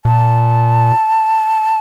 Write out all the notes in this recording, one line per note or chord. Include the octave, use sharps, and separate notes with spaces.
A#2 A5